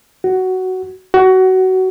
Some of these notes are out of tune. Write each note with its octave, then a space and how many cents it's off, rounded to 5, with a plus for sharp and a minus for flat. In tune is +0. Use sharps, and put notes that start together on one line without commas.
F#4 +10
F#4 +20